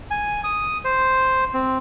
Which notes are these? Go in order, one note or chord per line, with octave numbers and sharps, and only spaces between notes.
G#5
D#6
C5
C4